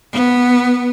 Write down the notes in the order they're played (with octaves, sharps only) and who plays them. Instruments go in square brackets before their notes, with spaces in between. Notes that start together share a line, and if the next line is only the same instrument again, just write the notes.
[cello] B3